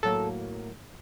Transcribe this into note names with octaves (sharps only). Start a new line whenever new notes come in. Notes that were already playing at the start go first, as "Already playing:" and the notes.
A2 F#3 A#3 A4